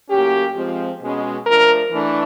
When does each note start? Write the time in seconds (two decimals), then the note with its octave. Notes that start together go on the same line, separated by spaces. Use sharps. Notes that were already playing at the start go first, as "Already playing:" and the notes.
0.10 A2 F#3 A#3 C#4 G4
0.55 F3 G#3 C4
1.01 B2 G#3 C#4
1.45 F3 A3 D4 A#4
1.91 E3 A3 D4